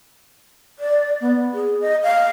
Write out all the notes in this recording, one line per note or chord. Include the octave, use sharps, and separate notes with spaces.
D5
B3
G#4
D#5
F5